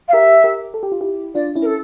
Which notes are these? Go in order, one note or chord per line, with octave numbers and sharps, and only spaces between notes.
F5
G4 A#4 E5
G4 A#4
A4
G4
F4
E4 G4
D4 F4 D5
C#4 E4
A#4
A4